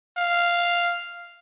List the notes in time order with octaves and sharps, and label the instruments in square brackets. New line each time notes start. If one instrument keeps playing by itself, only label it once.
[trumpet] F5